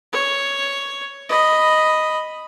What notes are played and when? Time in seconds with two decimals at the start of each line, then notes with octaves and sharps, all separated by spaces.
0.12 C#5
1.29 D#5 B5